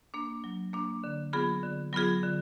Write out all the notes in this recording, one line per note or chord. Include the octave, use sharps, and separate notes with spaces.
A#3 D4
F#3
A#3 D4
D3
F#3 B3 F4 G#4
D3
F#3 B3 F4 G#4
D3